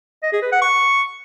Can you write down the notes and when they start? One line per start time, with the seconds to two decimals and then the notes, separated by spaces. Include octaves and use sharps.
0.23 D#5
0.33 G#4
0.42 B4
0.52 F#5
0.62 C#6